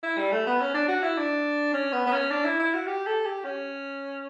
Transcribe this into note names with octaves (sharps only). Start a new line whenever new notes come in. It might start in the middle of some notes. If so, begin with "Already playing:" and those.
E4
G3
A3
B3
C#4
D4
F#4
E4
D4
C#4
B3
B3
C#4
D4
E4
E4
F#4
G4
A4
G4
C#4